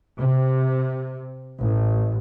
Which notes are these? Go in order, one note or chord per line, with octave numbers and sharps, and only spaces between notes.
C3
A1